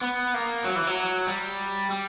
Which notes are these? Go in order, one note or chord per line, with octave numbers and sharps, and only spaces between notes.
B3
A#3
F#3
E3
F#3
G3
G3